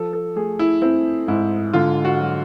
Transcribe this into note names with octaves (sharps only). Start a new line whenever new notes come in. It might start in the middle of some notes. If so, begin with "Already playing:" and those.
Already playing: F3 A4
A4
A3 G#4
E4
C4 E4
G#2 E4
D3 F4
F#4
F#3